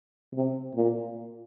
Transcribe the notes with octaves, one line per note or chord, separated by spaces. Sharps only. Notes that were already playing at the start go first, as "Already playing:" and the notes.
C3
A#2